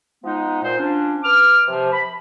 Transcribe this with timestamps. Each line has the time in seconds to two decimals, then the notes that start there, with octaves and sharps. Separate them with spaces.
0.23 F3 G#3 B3 D#4
0.62 A#2 C5
0.78 F3 C#4 D4
1.23 B4 D6 F6
1.67 C3 F3
1.92 B5